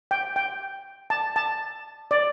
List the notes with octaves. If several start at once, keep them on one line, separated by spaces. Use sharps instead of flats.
G5
G5
A5
A5
D5